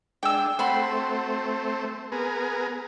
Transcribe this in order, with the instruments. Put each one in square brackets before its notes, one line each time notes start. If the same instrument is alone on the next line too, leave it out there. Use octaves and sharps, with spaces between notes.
[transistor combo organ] G#3 D4 [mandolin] G5 E6
[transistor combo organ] A3 C4 [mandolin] F#4 B5 C6
[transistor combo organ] B3 G#4 A#4